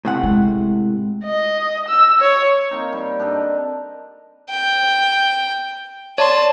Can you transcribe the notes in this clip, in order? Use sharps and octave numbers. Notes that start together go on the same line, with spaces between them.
A2 C3 F#5
G#3
D#5
E6
C#5
A#3 C4 D#4
G3
D4 G4 A4 D#5
G5
C#5 D5 A5 C6